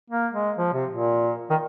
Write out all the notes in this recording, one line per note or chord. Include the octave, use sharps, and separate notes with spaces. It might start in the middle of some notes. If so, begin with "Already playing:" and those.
A#3
G#3
F3
C3
A#2
D#3